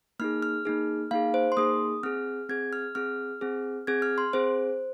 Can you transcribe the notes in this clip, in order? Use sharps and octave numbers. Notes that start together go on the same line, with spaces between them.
A#3 D#4 G#4 F6
F6
A#3 D#4 G#4
A#3 D#4 G#4 F5
C5
C6
A#3 D#4 G#4 D#6
C4 G#4 F6
C4 G#4 G#6
F6
C4 G#4 F6
C4 G#4
C4 G#4 G#6
F6
C6
C4 G#4 C5